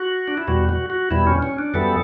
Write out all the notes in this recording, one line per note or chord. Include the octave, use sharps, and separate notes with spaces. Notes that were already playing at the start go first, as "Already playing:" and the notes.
Already playing: F#4
D4
E4
E2 B2 G3 F#4
F#4
F#4
E2 B2 G3 E4
C#4
C#4
D4
F#2 E3 G3 B3 A4